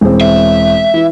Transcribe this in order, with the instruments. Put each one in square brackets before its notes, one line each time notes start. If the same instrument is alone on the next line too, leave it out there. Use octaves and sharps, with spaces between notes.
[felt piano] E1 C4
[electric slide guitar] E5
[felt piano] E3